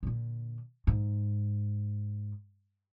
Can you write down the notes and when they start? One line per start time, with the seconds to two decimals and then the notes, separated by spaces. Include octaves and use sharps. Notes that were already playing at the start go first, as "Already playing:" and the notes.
0.03 A#2 D3
0.87 G#2